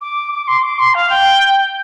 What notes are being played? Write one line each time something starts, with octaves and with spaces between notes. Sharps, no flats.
D6
D6
C6
D6
C6
F5
G5